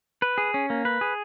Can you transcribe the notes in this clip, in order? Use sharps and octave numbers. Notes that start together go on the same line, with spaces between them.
B4
G#4
C#4
A#3
B4
G#4